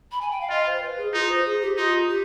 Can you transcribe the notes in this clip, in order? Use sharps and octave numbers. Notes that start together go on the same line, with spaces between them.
B5
G#5
G5
F5
F4 D#5
C5
C5
B4
G#4
D#4 F4
C5
G#4
G4
D#4 F4
G4